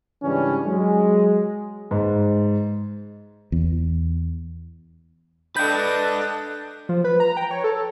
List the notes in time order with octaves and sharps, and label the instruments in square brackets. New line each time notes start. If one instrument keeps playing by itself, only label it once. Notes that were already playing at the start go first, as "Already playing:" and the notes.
[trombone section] G#2 C#3 E3 G3 C#4 D4
F#3 G#3
[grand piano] G#2
[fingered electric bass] E2
[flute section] D4 F#6 [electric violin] A4 D#5 [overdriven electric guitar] B4 G5 [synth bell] G6
[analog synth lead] F3
B4
A#5
G5
C#5
A4